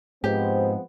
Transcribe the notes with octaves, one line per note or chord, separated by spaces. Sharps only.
G#2 F3 G#3 B3 C4 G4